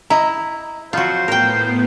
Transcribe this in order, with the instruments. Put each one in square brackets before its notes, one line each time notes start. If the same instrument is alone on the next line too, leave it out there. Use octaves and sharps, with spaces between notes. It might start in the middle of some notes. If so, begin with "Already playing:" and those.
[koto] E4 [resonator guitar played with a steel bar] D#5 A#5
[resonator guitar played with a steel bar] F2 F#3 [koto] F4 F#4 [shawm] C5
[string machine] A2 B3 [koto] A#4 G5